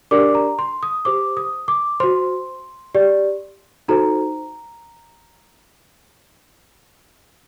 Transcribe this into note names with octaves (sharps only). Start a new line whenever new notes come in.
D4 G4 A#4 D5 D6
A#5
C6
D#6
G4 C5 D6
D#6
D6
F#4 C5 C6
G4 D5
D#4 F#4 A4 C5 A#5